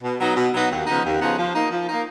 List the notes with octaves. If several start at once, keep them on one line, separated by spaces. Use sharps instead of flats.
B2
F#3 B3 D#4 F#4
B2
F#3 B3 D#4 F#4
D#2
C#3 F3 B3 D#4
D#2
C#3 F3 B3 D#4
F3
A#3 D#4
F3
A#3 D#4